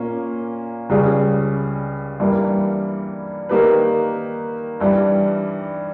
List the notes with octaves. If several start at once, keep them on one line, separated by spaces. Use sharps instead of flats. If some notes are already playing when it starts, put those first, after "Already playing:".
Already playing: A#2 A#3 C#4
C#2 C#3 G3 C#4 G#4
G2 E3 G3 A#3
D#3 A#3 D#4 G4 B4
G2 E3 G3